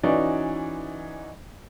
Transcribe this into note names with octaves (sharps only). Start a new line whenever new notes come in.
E3 C#4 D#4 F#4 D5